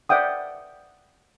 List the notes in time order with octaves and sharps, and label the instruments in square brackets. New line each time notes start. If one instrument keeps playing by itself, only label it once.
[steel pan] D5 E5 F#5 G5 D#6